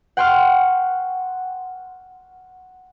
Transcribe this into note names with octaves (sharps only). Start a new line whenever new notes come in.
F#5 G5 C6 C#6 F6